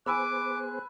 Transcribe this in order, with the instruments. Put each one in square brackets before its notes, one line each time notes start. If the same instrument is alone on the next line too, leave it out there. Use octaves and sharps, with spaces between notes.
[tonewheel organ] B3 G#4 C5 [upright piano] G#5 B5 E6 [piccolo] D6 [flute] F#6